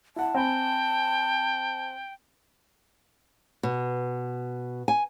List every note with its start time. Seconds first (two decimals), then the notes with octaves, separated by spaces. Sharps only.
0.16 E4 F#5 A5
0.35 C4 G5 G#5 B5
3.63 B2
4.88 G#5